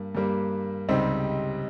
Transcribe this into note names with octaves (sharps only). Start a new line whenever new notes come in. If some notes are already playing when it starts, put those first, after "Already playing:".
Already playing: G2 G3 A#3
G2 G3 A#3
C#2 C3 G3 C4 D#4